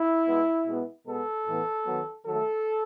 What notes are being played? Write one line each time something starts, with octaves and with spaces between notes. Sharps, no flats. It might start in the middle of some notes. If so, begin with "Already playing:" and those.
Already playing: E4
B2 G#3 B3
B2 G#3 B3
B2 G#3 B3 A4
A2 E3 B3
D#3 F#3 B3
D#3 F#3 A3 A4